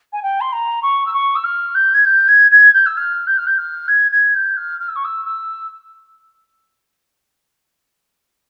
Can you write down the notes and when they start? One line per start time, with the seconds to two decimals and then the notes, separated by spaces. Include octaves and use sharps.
0.12 G#5
0.22 G5
0.40 C6
0.52 A#5
0.82 C#6
1.06 E6
1.13 C#6
1.35 E6
1.44 F6
1.74 G6
1.93 G#6
2.05 G6
2.28 G#6
2.51 G#6
2.73 G6
2.86 E6
2.97 F6
3.27 G6
3.37 F6
3.46 G6
3.58 F6
3.88 G#6
4.11 G#6
4.34 G6
4.56 F6
4.79 F6
4.88 E6
4.95 C#6
5.04 E6
5.25 E6